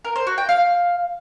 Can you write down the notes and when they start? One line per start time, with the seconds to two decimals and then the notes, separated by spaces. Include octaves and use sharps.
0.05 A#4
0.16 C5
0.27 F#4
0.38 G5
0.49 F5